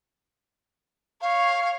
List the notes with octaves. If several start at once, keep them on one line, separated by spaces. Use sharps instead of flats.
C#5 F5